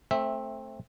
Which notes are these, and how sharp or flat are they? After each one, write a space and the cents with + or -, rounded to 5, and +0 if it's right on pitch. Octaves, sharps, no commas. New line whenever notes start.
A3 +0 C4 +15 E5 -10